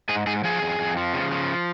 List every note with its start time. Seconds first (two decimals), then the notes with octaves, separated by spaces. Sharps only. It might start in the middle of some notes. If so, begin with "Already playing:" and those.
0.09 G#2 G#4
0.27 G#2 G#4
0.44 F3 G#4
0.62 F2
0.79 F2
0.97 F3
1.14 C#3
1.32 F3